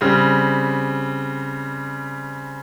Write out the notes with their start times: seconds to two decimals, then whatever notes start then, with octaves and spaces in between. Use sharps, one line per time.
0.01 C#3 G3 C4